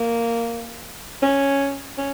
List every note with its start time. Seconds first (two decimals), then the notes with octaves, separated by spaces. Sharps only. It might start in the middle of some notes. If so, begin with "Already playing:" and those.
Already playing: A#3
1.22 C#4
1.98 C#4